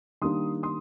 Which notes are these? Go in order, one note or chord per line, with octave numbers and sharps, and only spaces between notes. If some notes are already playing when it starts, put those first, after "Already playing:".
D#3 G3 A#3 D4 C6 D#6
C6 D#6